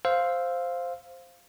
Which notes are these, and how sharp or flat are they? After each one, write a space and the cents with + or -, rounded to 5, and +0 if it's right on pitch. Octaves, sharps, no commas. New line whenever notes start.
C5 +0 F5 +0 E6 +0